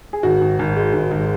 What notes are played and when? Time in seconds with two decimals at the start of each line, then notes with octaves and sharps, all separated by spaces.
0.13 G#4
0.23 G#1 F#4
0.41 G#1
0.59 G#1
0.76 G#3
0.93 G#1
1.11 G#1